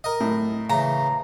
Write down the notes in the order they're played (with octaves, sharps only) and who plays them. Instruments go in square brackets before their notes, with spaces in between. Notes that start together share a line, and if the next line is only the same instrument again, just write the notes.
[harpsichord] A#4 D#5
[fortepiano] A2
[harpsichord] C#3 E3 [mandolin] A#5